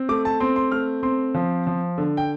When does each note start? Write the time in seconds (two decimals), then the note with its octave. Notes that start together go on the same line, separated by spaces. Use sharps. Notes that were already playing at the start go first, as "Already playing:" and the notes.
Already playing: C4
0.09 A3 D6
0.25 A5
0.40 C4 C6
0.56 C6
0.72 A3 F6
1.03 C4 C6
1.34 F3
1.67 F3
1.98 D3
2.17 G5